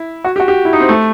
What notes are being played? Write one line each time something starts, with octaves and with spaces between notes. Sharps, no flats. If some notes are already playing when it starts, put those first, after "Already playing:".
Already playing: E4
F#4
G4
F#4
G4
E4
D#4
C4
A3